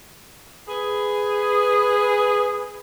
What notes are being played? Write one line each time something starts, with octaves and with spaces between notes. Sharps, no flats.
G#4 B4